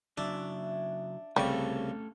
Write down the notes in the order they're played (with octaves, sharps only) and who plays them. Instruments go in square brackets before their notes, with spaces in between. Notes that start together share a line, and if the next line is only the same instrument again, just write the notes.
[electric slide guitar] C#3 F#3 [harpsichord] D4 [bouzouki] E5
[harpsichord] C2 C#3 C#6 [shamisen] G3 [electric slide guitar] A3 C#4 A4